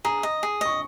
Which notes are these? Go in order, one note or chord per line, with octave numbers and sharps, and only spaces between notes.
G#4 A#5
D#5
G#4
D#5 C#6